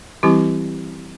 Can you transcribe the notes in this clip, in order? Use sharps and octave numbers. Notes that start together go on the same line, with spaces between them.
E3 G3 C4 E4 G4